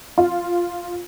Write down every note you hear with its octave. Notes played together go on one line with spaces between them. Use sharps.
F4